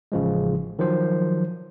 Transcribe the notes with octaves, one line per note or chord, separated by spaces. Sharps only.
A1 C#3 F3 G#3
D#3 F3 F#3 C5